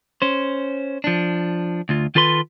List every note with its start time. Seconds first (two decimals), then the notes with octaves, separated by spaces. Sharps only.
0.22 C#4 C5
1.04 F3 D4
1.89 D2 F4
2.15 D#3 F4 A4 B4 C6